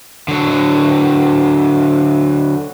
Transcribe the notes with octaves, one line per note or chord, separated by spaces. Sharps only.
D3 F#3